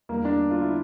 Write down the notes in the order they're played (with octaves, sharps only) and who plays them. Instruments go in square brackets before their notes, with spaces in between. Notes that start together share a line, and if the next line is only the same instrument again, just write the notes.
[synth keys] E2 D3 G3 [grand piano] A#3
[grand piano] D4
F4
E4